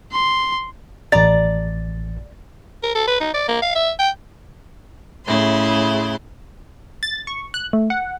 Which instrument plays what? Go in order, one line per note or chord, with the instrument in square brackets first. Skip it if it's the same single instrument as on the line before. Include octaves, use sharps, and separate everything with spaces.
[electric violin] C6
[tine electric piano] A1 A6 [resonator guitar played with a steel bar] D5 A#5
[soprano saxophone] A#4
A4
B4
D#4
D5
A#3
F5
E5
G5
[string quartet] A2 C#3 E4 C6
[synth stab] A6
C#6
F#6
A3
F#5